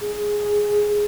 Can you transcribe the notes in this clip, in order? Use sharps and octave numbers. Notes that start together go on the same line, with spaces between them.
G#4